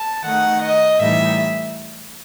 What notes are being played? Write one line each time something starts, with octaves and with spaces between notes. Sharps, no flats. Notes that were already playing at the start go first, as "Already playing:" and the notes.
Already playing: A5
D#3 A3 D#4 F#5
D#5
A2 E3 G3 D#4 E5